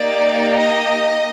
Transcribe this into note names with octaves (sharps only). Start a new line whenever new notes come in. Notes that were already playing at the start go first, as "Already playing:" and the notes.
Already playing: A#3 D#4 G4 D5
D#5